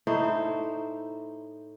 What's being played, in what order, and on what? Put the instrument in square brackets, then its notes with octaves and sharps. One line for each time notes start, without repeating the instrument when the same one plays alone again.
[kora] A2 D#4 E4 C5